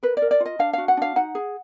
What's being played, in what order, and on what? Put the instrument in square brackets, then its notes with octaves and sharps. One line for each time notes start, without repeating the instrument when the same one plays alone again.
[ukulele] A#4 B4
D5
A#4
D5
F4
D#5
D4 F5
F#4 F5
F#5
D4 F5
D#4 F#5
G#4